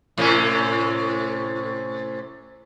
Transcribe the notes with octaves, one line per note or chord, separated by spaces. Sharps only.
A2 C3 C#4